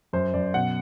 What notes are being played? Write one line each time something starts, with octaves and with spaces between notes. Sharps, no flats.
F#2 C5
F#2 D5
B2 F#5